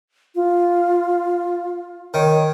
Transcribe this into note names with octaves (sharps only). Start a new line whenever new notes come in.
F4
D#3 C#5